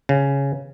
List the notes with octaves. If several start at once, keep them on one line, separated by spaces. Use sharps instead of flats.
C#3